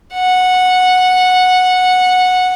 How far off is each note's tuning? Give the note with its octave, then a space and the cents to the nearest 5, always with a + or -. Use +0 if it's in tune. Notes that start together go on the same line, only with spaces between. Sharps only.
F#5 -10